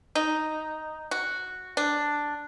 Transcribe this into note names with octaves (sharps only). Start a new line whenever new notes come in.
D#4
F#4
D4